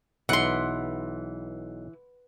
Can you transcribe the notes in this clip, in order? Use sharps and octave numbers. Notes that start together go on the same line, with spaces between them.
B1 E3 F#5 C6